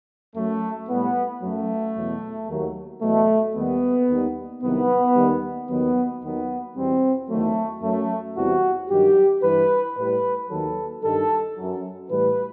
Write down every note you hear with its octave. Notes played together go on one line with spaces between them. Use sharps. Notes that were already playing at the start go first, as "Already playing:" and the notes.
F#2 F#3 A3
A2 G3 B3
F#2 F#3 A3
E2 B2 F#3
D#2 D#3 F#3
E2 B2 F#3 A3
D#2 D#3 G3 B3
D#2 D#3 G3
C2 C3 D#3 F#3 B3
D#2 D#3 G3
D#2 D#3 F#3 B3
D#2 D#3 F#3 B3
E2 B2 G3 C4
E2 D#3 F#3 A3
F#2 F#3 A3
E2 C3 E3 G3 F#4
G2 D#3 F#3 G4
G2 E3 G3 B4
A2 G3 B4
D#2 D#3 F#3 A4
G2 D#3 G3 A4
F#2 F#3
A2 E3 G3 B4